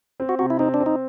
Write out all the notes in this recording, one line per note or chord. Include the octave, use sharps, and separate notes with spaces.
C4
F#4
C3 F#4
E4
C4 D#4
D4
C4
D#4